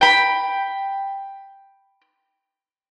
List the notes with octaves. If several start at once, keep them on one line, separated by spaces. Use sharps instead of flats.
G5 B5